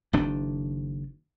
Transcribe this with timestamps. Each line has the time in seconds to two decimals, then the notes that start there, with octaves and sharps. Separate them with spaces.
0.13 F#1 D#3 D4